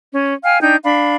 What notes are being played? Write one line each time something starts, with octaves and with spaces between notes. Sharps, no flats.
C#4
F5 G5 G#5 F6
D4 D#4 G5 G6
D4 F5 B5